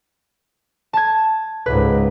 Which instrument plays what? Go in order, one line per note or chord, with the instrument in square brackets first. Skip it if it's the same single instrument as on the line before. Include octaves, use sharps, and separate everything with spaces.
[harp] A5 G#6
[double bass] C#2 G#2 [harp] B4